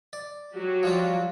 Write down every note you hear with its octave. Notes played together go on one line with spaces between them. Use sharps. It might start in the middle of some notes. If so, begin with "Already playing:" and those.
D5
F#3 F#4 G4
F3 G3 F4